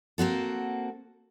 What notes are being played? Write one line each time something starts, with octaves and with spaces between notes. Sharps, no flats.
A#3 C4 F#4 A4